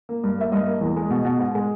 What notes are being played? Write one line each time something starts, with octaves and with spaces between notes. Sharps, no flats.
A#3
G2
A#3 E5
G2 D#5
A#3
E2
G#3
B2
B2
G#2
G#3